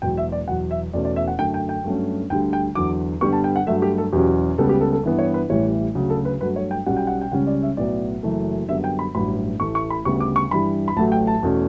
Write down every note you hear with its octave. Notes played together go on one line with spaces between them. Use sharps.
E1 E2 B2 F#3 G5
E5
D5
E2 B2 F#3 F#5
E5
E2 B2 A3 C#4 D5
D5
E5
F#5
F#2 D3 A3 G5
G5
G5
G2 F#3 A3 C#4
D2 D3 G3 G5
G5
E2 D3 F#3 D6
G2 D3 G3 B3 C#6
A5
G5
F#5
G2 F#3 A3 E5
G4
A4
E2 B2 F#3 C#4 G4
C#2 C#3 G3 B3 A4
G4
A4
A4
G2 E3 B3
C#5
B4
A1 A2 E3 G3 C#5
D2 C#3 F#3
A4
B4
G2 F#3 A3 B4
C#5
G5
B1 B2 G3 C#4 F#5
G5
F#5
G5
C#2 C#3 G3 C#4 F#5
D5
E5
B1 A2 F#3 B3 D5
F#1 F#2 E3 A3
F#2 D3 G3 B3 E5
G5
B5
A1 G2 F#3 B5
A1 A2 E3 A3 C#6
C#6
B5
D2 C#3 G3 B3 C#6
D6
C#6
G2 E3 G3 B5
B5
A1 A2 F#3 A3 A5
G5
A5
E2 B2 A3 C#4